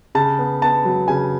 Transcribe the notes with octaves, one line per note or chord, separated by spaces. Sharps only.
C#3 A5
B3
B3 A5
F#3
C#3 G#5